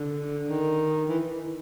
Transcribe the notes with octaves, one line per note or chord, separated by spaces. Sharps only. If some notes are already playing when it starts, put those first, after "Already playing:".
Already playing: D3
D#3
E3